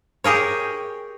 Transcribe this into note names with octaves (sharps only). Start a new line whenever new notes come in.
G4 G#4 A#4 C#5